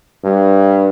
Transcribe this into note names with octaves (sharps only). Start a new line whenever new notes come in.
G2